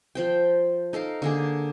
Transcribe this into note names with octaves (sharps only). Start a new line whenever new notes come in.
F3 C5 G5
D#4 A4 A#4 F5
D3 A#3 G#4